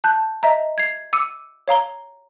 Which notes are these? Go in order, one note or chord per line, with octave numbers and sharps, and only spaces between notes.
A5 F#6 G6
D#5 E5 A#5
G#6 C7
D6 E6 C#7 D#7
C#5 F5 A#5 G7